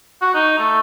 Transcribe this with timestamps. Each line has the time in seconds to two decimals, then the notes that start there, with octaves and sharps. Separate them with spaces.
0.21 F#4
0.35 D#4
0.58 A3